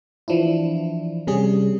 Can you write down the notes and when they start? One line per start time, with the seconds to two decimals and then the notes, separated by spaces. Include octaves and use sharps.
0.28 E3 F3 D4 E4
1.27 C3 G3 C#4 G#4